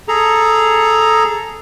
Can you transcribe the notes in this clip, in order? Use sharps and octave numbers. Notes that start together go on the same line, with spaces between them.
G#4 A4 A#5